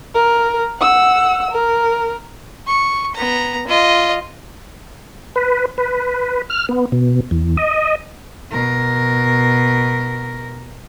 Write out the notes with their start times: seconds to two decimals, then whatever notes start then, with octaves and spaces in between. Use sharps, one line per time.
0.14 A#4
0.79 F#5 E6
1.51 A#4
2.67 C#6
3.15 B3 A#5
3.67 F4 D#5
5.36 B4
5.78 B4
6.50 F6
6.69 B3
6.92 B2
7.31 E2
7.57 D#5
8.52 B2 A#4